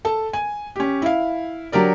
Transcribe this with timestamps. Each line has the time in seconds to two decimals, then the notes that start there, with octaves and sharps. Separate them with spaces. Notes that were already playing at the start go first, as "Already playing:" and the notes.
0.05 A4 A5
0.33 G#5
0.76 C#4 G4
1.02 E4 F5
1.72 F#3 D4 G4 A#4 D5